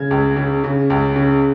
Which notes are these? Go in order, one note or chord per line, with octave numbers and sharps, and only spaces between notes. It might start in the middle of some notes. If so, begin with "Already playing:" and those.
Already playing: C#3 G#6
C#2
C#3
C#3
C#2
C#3